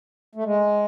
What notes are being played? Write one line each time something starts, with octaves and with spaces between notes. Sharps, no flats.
A3
G#3